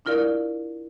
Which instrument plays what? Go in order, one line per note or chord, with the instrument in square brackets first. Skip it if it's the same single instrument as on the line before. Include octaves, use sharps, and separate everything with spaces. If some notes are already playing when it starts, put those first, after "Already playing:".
[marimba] D4 E4 F4 A#4 D5 F5